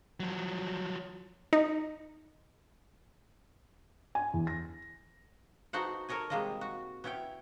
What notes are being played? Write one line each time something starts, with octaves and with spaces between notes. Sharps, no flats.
F3 F#3
D#4
G#5
E2
A#6
B3 D#4 F#4 A4 C5 F#5
A4 A#4 C#5 D#5 G#5
C3 G3 G#3 A#3 F4 D#5
F#4
B3 C#4 E4 C#5 G5